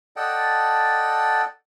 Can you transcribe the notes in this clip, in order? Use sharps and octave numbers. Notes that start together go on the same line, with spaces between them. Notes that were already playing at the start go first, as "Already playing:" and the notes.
A4 D5 D#5 F#5 G5 A5